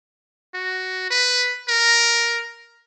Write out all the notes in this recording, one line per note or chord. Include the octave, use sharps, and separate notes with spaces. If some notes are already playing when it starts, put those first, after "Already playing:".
F#4
B4
A#4